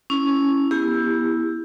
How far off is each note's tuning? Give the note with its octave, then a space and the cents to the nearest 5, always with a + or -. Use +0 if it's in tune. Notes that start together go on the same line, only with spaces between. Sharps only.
C#4 +0 E4 +0
B3 -20 E4 +0 G4 +20